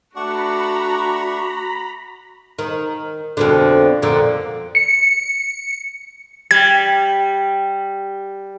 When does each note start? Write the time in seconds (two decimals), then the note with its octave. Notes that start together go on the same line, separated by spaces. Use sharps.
0.16 A3 D4 F#4 F#5 A#5 B5 C#6
2.59 D#3
3.37 F2 B2 D3
4.02 F2 A#2 D3
4.75 C#7
6.51 G3 G#6